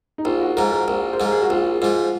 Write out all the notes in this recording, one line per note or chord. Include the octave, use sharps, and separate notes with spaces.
D#4
A#1 F4
F#4
G#2 F3 A#4
A#4
A#1
C5
G#2 F3 A#4
G#4
F#4
A#1 F4
G#2 F3 F4